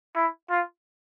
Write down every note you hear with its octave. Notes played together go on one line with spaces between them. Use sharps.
E4
F4